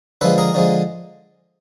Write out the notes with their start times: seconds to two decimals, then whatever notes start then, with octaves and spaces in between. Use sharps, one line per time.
0.21 D3 F3 G#3 A4 B4
0.38 G#4 A#4
0.54 D3 F3 G#3